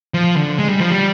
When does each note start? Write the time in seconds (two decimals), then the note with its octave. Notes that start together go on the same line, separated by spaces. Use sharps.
0.14 F3
0.36 D3
0.59 G#3
0.69 G3
0.80 F3
0.91 G3